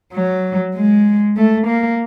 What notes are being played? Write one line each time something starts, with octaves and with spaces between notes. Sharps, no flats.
F#3
G#3
A3
A#3